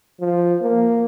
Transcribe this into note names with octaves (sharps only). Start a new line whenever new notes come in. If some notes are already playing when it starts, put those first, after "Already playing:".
F3
A#3